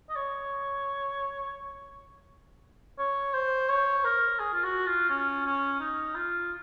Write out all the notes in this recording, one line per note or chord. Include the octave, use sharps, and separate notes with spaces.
D#5
C#5
C#5
C5
C#5
A#4
G#4
F4
F#4
F4
C#4
C#4
D#4
F4